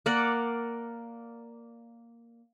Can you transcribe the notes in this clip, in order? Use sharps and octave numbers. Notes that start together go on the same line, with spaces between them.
A#3 A#4 D5 F#5